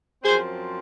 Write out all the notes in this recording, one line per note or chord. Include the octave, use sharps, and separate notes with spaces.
F#2 F3 C4 G#4 C5